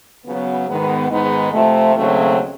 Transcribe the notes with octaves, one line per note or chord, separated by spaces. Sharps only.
C#3 F#3 B3
G#2 D#3 G#3 B3
G#2 D#3 G#3 B3 D#4
C3 F3 A3
D#2 C#3 F#3 A3 C4